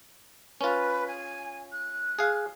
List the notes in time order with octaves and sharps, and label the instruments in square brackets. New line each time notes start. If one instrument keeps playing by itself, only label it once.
[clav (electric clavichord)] C#4 F4 [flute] B4
[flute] G#5
F#6
[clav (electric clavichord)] G#4 F5